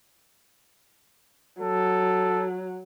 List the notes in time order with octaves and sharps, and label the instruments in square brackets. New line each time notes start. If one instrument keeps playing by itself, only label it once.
[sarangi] F#3 [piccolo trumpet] A4